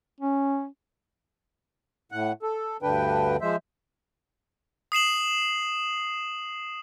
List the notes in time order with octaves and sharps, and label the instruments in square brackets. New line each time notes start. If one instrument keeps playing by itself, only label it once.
[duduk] C#4
[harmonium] A2 F#5
A4
D2 G2 D3 D4 B4 G5
F3 G#3 C5 E5
[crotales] D#6 C7 E7 F#7